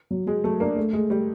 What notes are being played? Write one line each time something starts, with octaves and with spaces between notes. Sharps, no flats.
F#3
F#3 G#3
F#3 A3
A#3 D4
A3
G#3 A3
G3 A3